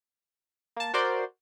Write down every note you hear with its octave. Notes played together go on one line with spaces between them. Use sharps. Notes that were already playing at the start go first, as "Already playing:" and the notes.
A#3 A5
F#4 A#4 C5 D5 C6